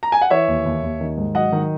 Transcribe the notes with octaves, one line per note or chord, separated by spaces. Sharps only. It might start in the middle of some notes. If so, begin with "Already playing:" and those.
A#5
G#5
F#5
E3 C#5 E5
D#2
D#2
D#2
D#3
G#2
F#3 D#5 F#5
D#3